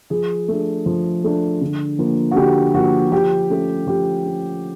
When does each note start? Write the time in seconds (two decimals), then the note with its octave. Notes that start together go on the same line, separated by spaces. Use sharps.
0.10 F3 G#4
0.48 A3 D4
0.86 F3
1.24 A3 D4
1.61 D3
1.99 F3 A#3
2.31 F#4
2.36 D3 G4
2.74 F3 A#3 F#4
3.12 F3 G4
3.50 A3 C#4
3.87 F3 G4
4.25 A3 C#4